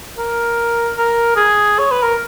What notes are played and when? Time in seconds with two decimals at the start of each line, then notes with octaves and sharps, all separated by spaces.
0.18 A#4
0.98 A#4
1.36 G#4
1.79 C#5
1.92 B4
2.03 A#4